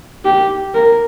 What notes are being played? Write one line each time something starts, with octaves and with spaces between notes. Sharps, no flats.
G4
A#4